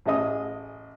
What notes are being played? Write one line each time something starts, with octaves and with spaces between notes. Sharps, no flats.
A1 G#4 D#5 D#6